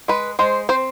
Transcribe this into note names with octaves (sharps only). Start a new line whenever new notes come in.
G#3 B4
G#3 C5
C4 C5